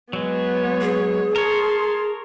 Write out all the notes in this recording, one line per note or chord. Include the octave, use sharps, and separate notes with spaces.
F#3 G#3 B3 C#5
G#4
A#4 C#5 A5 C6